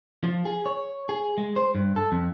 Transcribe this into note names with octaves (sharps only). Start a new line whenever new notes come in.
F3
G#4
C#5
G#4
G#3
C5
G2
A4
F2